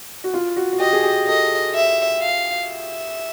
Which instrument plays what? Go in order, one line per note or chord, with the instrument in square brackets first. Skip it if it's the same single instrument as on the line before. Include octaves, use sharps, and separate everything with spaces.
[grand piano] F#4
F4
F#4
F#4
[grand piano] G4 [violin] D#5
[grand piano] G#4
G4
[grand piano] A4 [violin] D#5
[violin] E5
F5
E5